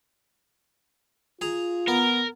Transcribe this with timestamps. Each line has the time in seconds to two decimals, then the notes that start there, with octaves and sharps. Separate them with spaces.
1.41 F4 G#4 A#5
1.88 B3 A#4